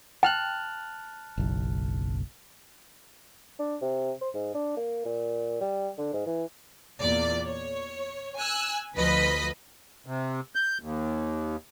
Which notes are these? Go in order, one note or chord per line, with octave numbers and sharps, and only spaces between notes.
G5 A5 F6 F#6
F#1 B1
D4
C3
C5
G#2
D4
A#3
A#2
G3
D3
G#2
E3
E2 A#2 D5
C#5
G#5 E6 F#6
D2 F3 B4 D#5 B5 B6
C3
G6
D#2